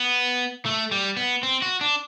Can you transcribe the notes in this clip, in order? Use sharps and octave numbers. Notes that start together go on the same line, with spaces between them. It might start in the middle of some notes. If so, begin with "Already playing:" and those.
Already playing: B3
A3
G3
B3
C4
F#4
D4